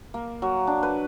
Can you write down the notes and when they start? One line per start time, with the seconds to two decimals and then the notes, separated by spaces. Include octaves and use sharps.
0.14 A#3
0.42 F#3
0.67 D4
0.83 B4